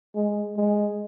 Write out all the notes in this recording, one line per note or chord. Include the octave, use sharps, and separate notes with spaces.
G#3
G#3